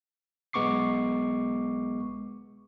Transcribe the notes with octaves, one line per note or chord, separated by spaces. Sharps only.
B1 G#3 B3 C#6 D6 C7